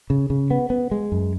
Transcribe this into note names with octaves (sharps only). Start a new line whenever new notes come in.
C#3
C#3
B3
B3
G#3
F#2